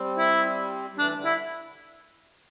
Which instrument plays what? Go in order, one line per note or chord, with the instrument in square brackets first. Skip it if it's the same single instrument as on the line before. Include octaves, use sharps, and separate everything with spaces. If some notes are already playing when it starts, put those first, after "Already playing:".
Already playing: [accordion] G3 C4
[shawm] E4
[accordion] G3
[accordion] E3 A3 [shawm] D4
[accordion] D3 G3
[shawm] E4